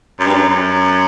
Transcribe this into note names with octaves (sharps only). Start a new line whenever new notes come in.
F#2
G2
F#2
F#2